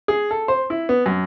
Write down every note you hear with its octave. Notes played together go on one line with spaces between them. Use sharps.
G#4
A4
C5
E4
B3
F#2